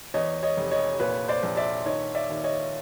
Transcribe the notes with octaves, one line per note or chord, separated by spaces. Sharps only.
E2 C#5 D#5
C#5 D#5
F1
C#5 D#5
A#2 B4 C#5
C5 D5
A#1
D5 E5
D#3 C#5 D#5
D5 E5
D#2
C#5 D#5